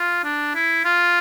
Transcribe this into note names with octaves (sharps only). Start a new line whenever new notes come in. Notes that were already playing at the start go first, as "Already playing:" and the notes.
Already playing: F4
D4
E4
F4